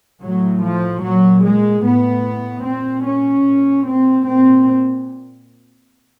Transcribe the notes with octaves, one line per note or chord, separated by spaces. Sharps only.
A2 F#3
F3
A#2 F#3
G#3
A2 B3
A#2 C4
C#4
A#2
C4
A#2 C4